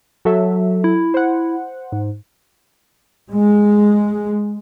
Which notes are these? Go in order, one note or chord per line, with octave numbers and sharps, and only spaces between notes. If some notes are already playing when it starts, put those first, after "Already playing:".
F#3 A4 E5
E4
C5 F#5
G#2
G#3